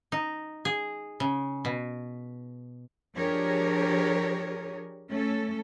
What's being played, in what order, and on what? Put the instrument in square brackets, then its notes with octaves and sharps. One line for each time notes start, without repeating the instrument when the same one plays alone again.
[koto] D#4
G#4
C#3
B2
[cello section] F3 D4 G4 G#4 A#4 C#5
A3 C#4 A4